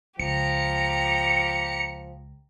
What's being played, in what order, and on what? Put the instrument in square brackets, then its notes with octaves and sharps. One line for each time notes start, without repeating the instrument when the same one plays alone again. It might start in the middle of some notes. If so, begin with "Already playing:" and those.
[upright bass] C#2 [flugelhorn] F3 [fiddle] G4 A#5 [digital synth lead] C#7